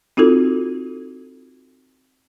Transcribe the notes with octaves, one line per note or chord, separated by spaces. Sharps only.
C4 D#4 F4 F#4 A4